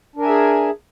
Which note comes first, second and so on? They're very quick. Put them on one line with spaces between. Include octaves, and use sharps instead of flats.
D4 A#4 G#5 E5 G#4